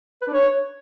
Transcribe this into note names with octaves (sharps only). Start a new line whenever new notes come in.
B4
D4
C#5